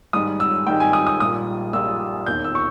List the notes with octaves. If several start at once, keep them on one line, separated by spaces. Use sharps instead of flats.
G#2 D#3 G3 D#6
E6
G#2 D#3 G3 G5
G#5
D#6
D#6
A#1 A#2 G3 A#3 D#6
A#1 A#2 G3 A#3 E6
E1 D#2 D#3 G6
E6
C#6